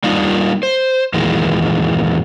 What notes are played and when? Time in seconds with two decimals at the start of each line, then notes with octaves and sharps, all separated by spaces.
0.04 G3 A#3 D4 D#4 F4
0.63 C5
1.14 E2 A#2 D#3 E3 G#3